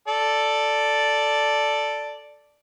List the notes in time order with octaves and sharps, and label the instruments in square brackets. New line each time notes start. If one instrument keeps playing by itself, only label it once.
[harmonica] A4 D5